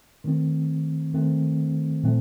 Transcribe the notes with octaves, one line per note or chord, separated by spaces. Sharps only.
D#3 A3 C4
D#3 A3 C4
A#2 F3 A3 C4